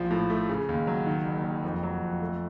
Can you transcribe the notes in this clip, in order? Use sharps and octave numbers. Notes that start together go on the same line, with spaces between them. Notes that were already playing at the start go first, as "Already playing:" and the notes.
Already playing: A#1 F3
A2
A3
C#3
D#2
F#3
D#3
F#1
F#1
F2
F#3
F2
A3